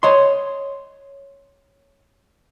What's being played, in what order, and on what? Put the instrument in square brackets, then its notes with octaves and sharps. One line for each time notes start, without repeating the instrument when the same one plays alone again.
[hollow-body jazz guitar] C#5 D#5 C6